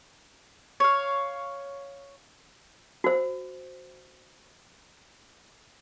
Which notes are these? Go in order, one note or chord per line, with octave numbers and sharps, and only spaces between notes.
C#5 F5
F#4 C5